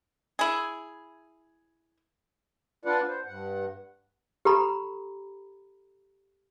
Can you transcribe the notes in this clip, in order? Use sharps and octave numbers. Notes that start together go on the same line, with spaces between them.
E4 G#4
D4 F4 B4 D5 F#5
C5
G2 F#5
G4 A4 A#5 B5